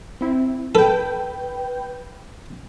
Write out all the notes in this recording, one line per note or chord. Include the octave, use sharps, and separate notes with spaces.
C4 E4
A4 B4 G5